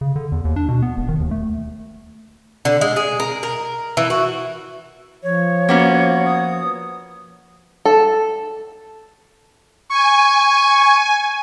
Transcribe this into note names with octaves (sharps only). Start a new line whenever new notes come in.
C#3
D3
E2
D#2
D4
B2
B3
E1
D#3
D#2
A3
D3
G#3
G#4
A#4
A#4
E3
F#4
F3 C#5
A#3 B3 C#4 F#4
D#6
A4
G#5 C#6